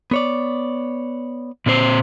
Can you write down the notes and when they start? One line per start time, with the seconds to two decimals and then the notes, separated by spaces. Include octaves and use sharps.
0.11 B3 C#5 D5
1.66 A#2 C4 C5